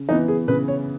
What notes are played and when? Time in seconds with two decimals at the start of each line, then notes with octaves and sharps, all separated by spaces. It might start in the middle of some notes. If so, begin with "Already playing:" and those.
Already playing: C#3
0.09 E3 B3 D#4
0.28 G#4
0.48 C#3 B4
0.68 C#5